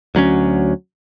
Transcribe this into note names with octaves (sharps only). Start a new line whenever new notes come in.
D2 F#3 G3 C#4